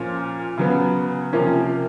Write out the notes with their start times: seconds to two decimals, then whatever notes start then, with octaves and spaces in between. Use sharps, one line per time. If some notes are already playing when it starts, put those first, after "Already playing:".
Already playing: A#2 F3 A#3 C#4 F4
0.58 C#3 F#3 B3
1.33 C3 F3 A#3 C#4